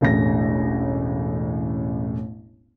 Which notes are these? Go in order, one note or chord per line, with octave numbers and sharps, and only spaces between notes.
E1 A1 A2 A#6